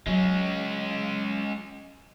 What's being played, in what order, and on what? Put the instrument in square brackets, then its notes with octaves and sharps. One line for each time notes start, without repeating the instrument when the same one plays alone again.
[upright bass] F#3 [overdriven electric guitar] G#3 C#4